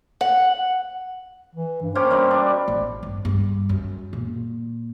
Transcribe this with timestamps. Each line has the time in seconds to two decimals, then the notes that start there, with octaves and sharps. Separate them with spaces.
0.21 F#5
1.54 E3
1.82 G2
1.95 A#3 C#4 G4 C5
2.11 G2 B2 B5
2.31 D4
2.68 A1
3.03 G2
3.25 G2
3.69 F#2
4.13 A#2